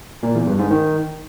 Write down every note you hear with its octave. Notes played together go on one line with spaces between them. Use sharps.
A#2
E2
G2
G#2
D#3